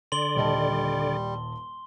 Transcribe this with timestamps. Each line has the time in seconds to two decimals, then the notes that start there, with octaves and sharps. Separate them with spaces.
0.12 D3 D5 C6 G7
0.35 D#1 G3 D#5 A5